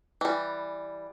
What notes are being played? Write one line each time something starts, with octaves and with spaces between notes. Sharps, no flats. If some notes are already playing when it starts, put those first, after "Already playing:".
E3 G3